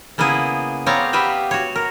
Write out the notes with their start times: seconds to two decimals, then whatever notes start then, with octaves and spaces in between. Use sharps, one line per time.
0.18 C#3 A#3 B3 E4 G#4 B4
0.86 B3 C4 C#5 D5 F5 A#5
1.13 B3 G4 B4 E5 F5 G5
1.51 F#4 C#5
1.76 A#4